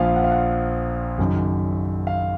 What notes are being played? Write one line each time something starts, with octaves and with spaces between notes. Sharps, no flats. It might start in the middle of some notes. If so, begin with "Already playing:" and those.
Already playing: A#1 A#2 F3 F5
F#5
F5
F#5
F#1 F#2 D#3
F5